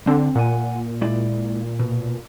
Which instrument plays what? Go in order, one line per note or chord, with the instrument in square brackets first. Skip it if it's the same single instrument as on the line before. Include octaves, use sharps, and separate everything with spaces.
[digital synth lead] D3 [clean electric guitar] C4
[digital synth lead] A#2 [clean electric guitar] F#5 G#5
[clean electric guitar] G#3 E4 D5
B2